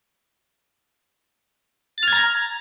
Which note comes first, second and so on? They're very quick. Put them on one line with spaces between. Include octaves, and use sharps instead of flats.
A6 F6 G#6 A#5